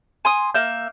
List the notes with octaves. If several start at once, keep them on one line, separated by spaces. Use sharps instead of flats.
G#5 C6 D#6
A#3 E5 G6